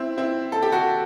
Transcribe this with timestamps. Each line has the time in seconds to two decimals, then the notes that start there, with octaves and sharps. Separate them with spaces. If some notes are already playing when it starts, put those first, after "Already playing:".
Already playing: C4 E4
0.18 C4 E4
0.52 A4
0.62 G4
0.72 F#4 A4